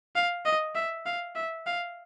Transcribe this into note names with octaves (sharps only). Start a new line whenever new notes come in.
F5
D#5
E5
F5
E5
F5